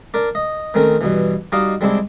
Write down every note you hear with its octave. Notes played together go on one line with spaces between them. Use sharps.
D4 A#4 D5
D#5
D#3 A3 C4 C#4 A#4
G2 B2 E3
G3 D#4 F#4 D#5 F5 D6
G3 G#3 C4 D4 E4 G4